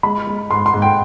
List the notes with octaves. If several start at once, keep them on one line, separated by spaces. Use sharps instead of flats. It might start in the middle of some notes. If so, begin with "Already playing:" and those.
G#3 B5
G#3
G#2 C6
C6
G#2
G5